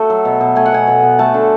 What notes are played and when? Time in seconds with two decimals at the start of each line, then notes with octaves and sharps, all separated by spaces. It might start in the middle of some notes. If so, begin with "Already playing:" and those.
Already playing: A3 F#4 A4
0.10 F#3
0.25 B2
0.41 B2
0.56 A3 G#5
0.66 F#5
0.72 B2 G#5
0.87 B2
1.03 B2
1.19 A3 A5
1.34 D3